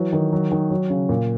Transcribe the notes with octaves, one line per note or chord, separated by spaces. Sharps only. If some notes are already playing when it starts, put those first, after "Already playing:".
Already playing: E3 F#3
D#3
F#3
D#3
F#3
C#3
A#2